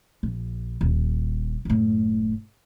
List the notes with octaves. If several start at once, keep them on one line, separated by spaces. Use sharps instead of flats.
A#1
D#1
F#1 A2